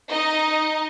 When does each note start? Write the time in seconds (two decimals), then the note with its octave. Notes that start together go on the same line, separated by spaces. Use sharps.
0.10 D#4 D#5